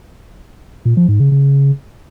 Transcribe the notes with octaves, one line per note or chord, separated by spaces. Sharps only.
A#2
F3
G#2
C#3
C#3